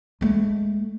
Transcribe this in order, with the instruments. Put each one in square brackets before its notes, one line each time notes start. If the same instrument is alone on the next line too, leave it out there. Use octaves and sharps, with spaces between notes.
[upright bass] G#3 A3